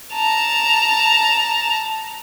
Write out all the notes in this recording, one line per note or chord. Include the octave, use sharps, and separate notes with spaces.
A5 A#5